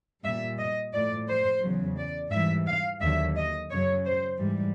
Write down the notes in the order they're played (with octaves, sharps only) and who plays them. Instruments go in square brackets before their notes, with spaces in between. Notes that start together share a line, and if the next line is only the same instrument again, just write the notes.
[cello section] A#2 G3 E5
D#5
A2 F3 D5
C5
E2 C#3 F#3
D5
G#2 E3 G3 E5
F5
D#2 D3 F#3 E5
D#5
F#2 C#3 F#3 C#5
C5
G#2 E3 G3